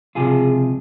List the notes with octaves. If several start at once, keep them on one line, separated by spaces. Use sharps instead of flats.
C#2 C3 F3 F4 G#4